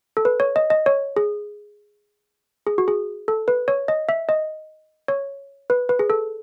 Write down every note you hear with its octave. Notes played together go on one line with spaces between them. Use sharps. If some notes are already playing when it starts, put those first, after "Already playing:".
A4
B4
C#5
D#5
D#5
C#5
G#4
G#4
F#4
G#4
A4
B4
C#5
D#5
E5
D#5
C#5
B4
B4
G#4
A4